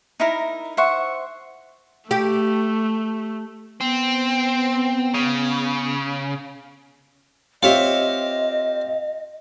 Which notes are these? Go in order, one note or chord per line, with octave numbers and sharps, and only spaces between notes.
D#4 E4 A#4
C5 E5 F#5 C#6
A3 G4
B3 C4
C#3
C4 F4 G4 C#5 D#5 E5